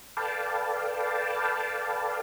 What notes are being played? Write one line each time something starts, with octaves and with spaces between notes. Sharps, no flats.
A4 B4 D5 F5 G5 A5